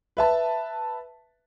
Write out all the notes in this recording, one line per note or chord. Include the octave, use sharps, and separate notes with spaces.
B4 E5 A5